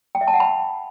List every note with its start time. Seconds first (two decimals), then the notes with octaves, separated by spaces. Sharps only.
0.15 G5
0.21 E5
0.27 A5
0.34 F#5
0.40 B5